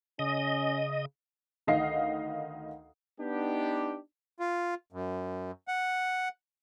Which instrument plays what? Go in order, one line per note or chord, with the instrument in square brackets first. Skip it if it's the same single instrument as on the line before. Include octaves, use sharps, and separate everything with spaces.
[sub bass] C#3 [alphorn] C#4 [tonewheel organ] D#5
[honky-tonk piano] D2 D#3 D#5 F5 C7
[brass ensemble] B3 D4 D#4 G4
[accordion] F4
F#2
F#5